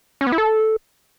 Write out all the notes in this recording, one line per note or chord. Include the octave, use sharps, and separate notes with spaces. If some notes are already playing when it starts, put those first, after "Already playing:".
C#4
B3
E4
A4